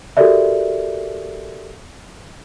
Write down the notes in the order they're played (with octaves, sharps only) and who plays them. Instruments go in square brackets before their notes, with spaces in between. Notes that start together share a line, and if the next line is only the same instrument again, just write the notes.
[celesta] F#4 G4 A4 A#4 D5 E5